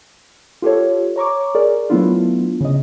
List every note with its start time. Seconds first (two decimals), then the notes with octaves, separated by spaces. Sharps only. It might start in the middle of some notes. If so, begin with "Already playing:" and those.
0.62 F4 G4 A4 C#5
1.16 C#5 A#5 C#6 D6
1.55 G#4 A#4 D5
1.90 F#3 A3 B3 D4 E4 F4
2.61 C#3 D#5